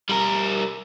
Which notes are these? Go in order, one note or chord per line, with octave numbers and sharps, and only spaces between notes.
G3 A#4